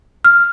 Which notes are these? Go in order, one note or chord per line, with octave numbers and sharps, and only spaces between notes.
F6